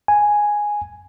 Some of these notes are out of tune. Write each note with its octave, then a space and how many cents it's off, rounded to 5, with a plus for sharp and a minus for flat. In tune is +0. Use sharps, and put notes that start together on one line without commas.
G#5 +0